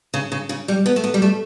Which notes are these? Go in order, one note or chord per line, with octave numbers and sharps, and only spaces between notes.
C#3
C#3
C#3
G3
B3
A3
B3
G3
A3